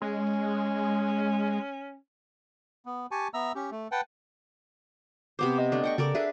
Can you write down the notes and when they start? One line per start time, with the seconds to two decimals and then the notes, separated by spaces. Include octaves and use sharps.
0.02 G#3 C#4
2.86 B3
3.11 G4 G#5 A5 C#6
3.34 B3 E5 A#5 E6
3.55 C#4 G4
3.71 A3
3.92 B4 F#5 G5 A5
5.39 C3 B3 C5 D6
5.58 D#5
5.72 A3 D4
5.84 F#5 G5 C#6
5.98 C#3 A4 A#4 D5
6.15 D4 G#4 B4 E5